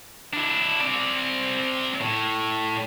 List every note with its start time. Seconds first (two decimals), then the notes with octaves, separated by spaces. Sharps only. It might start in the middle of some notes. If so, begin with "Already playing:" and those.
0.33 D4 E4
0.81 C4 D5
2.01 A2